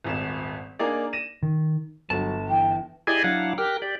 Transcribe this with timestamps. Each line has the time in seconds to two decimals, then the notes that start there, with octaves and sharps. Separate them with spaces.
0.04 D#1 G#1 E7
0.79 A#3 D4 D#4 G#4 D5
1.13 A#6 D#7 E7
1.43 D#3
2.10 G1 F#3 A5
2.49 E3 G5
3.07 E4 G4 G#4 D5 D#5 G#5
3.24 F#3 D4 E4 F5 F#5
3.58 G4 A#4 G5 F6 F#6
3.82 G4 D5